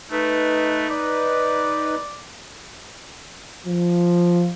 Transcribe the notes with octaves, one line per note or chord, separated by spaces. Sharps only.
A3 D#4 B4
D5
F3